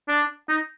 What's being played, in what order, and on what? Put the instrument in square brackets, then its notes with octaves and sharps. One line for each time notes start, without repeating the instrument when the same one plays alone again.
[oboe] D4
D#4